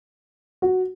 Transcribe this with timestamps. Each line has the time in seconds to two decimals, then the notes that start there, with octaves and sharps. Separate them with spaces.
0.62 F#4